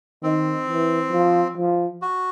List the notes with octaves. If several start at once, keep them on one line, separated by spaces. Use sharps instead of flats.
D#3 C4
E3
F3
F3
F#4